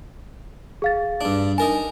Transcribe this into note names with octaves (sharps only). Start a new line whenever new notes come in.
G#4 F5 A6
G2 D4
D#4 A#4 G#5 A5